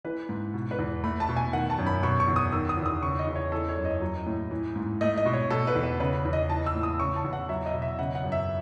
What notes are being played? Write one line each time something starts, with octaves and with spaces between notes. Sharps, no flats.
E3 B4
G#2
B2
B4
E2
A3 B5
A5
B2
G#5
D#3 F#5
A5
F#2
B5
B2 C#6
C#6
E2
D#6
D#3 E6
D#6
E2
D#6
C#3 C#6
D#5
E2
C#5
E3 A4
C#5
F#2
D#5
F#3
A2
E3
G#2
A3 D#5
D#5
B2
C#5
B2 A4
B4
E2
B4
C#3 B4
E2
D#5
E3 A5
E6
A2
D#6
C#3 C#6
A5
E2
F#5
F#3 E5
D#5
B2
E5
C#3 F#5
F#5
F#2
E5